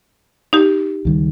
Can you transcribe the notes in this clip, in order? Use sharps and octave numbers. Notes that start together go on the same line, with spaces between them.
D#4 G4
C#2 D#3 G3